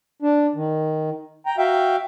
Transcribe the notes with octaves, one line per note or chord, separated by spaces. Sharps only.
D4
D#3
G5 A#5
F#4 E5 F5 G5